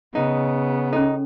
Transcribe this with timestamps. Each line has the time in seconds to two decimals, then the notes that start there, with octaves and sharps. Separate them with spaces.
0.15 C#3 B3 D#4
0.93 C#4 D#4 A4